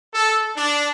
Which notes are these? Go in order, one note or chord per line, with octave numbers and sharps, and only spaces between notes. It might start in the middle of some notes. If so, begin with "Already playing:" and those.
A4
D4